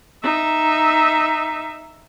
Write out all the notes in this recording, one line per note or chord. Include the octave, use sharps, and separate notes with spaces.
D#4 E5